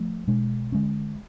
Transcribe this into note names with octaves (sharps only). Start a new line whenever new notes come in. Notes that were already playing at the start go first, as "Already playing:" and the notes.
Already playing: F3 A3
B2 G#3 D4
D3 G#3 C#4